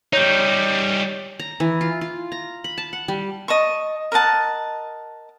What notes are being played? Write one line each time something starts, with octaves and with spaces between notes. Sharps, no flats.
G3 D#4 C#5 G6
A#5
E3
F4
F4
A#5
B5
A5
F#5
G3
D#5 A5 C#6
A#4 D#5 F#5 A5